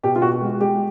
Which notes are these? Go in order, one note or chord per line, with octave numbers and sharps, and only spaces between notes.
B2 G4
F4
B2 F#4
G#3
G#3 G4